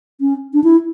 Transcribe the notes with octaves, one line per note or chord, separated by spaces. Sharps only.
C#4
D4
E4